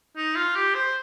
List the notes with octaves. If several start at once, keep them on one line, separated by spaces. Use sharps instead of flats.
D#4
F4
G4
C5